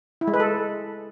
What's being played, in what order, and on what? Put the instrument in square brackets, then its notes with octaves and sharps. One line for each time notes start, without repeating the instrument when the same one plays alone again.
[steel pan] E4
G#3
B4
A4